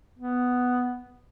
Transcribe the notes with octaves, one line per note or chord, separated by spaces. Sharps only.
B3